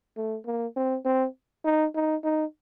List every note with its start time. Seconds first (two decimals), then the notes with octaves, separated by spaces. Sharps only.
0.17 A3
0.46 A#3
0.76 C4
1.05 C4
1.65 D#4
1.95 D#4
2.24 D#4